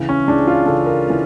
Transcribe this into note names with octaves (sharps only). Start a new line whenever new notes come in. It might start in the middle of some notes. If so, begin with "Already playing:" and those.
Already playing: C#2 C#3 E3
C#4
C#2 C#3 E3 D4
F4
C#2 C#3 E3 A4
A#4
C#3 E3